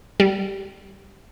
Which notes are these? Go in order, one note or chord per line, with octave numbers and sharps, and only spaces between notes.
G3